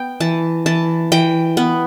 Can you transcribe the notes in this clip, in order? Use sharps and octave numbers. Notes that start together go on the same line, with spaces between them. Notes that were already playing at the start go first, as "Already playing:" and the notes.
Already playing: B3 G5
E3 A5
E3 A5
E3 G5
B3